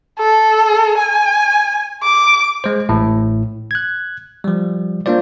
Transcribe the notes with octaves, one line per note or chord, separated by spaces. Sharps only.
A4
G#5
D6
G#3 C5
A1 A2
F#6 G#6
F3 G3
A#3 D4 F4 C5 D5